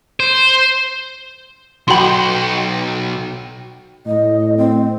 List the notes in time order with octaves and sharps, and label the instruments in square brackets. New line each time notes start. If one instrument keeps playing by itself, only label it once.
[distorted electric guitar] C5
[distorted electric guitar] B1 [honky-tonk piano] F#4 G5 [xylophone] B5 C6
[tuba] A2 [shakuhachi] D#5
[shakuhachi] C4